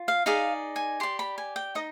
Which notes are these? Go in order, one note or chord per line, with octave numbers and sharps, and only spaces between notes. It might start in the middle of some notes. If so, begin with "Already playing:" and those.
Already playing: F4
F5
D#4 G#4 D5 F5
G#5
G4 D5 C6
B5
G#5
G5
D#4 D#5